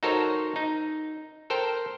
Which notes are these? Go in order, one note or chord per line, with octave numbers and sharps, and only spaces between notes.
D#4 F#4 A4 A#4 C5 C#5
D#4
A4 A#4 C5 G5